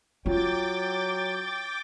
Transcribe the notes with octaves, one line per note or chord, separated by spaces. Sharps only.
F#3 F4 G5 D6 A6